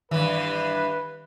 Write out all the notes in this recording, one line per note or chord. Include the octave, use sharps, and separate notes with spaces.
G2 D#3 E3 B4